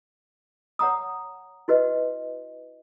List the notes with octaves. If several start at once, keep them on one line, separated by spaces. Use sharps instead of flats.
C#5 F#5 A#5 D#6
E4 F#4 B4 D#5